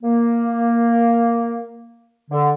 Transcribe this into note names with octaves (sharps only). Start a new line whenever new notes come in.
A#3
D3